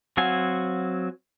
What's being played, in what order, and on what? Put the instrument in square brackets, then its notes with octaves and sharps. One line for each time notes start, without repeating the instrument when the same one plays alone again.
[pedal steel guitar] F#3 C4 F#4 F5 G#5